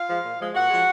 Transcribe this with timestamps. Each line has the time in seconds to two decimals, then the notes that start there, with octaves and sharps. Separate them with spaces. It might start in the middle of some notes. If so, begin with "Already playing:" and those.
Already playing: F4 F5
0.09 F3 G#3
0.24 A#2
0.40 F3 G#3
0.54 A#2 F#4 F#5
0.70 F3 G#3